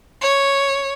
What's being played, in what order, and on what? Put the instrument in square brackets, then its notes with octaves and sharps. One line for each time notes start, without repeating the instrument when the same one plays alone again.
[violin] C#5